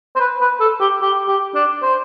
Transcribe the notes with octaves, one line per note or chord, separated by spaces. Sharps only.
C5
B4
B4
A4
G4
G4
G4
D4
C5